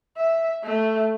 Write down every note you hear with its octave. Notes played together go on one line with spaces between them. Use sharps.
E5
A3